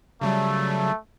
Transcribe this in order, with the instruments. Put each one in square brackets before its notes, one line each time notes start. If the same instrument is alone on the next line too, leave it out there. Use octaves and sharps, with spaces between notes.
[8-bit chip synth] C#3 F#3 G3 [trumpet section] A3